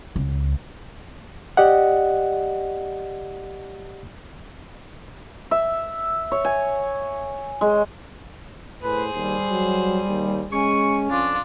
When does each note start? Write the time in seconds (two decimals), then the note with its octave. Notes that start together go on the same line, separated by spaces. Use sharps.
0.16 C#2
1.57 G4 D5 D#5 F#5
5.51 E5
6.32 C#5
6.45 G#5
7.61 G#3
8.83 A2 G#4 B4 C5
9.13 D#2 G3
9.49 F#3
10.09 D#2
10.53 G#3 C#4 G#5 C#6
11.11 F2 D4 F4